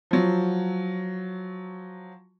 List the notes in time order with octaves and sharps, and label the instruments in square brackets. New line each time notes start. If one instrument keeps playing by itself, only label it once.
[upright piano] F3 F#3